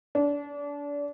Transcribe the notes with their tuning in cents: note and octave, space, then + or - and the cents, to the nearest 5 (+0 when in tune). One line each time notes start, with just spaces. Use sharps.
D4 -30